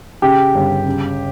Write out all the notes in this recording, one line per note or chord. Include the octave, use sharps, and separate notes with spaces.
C#3 G4
G1
C#3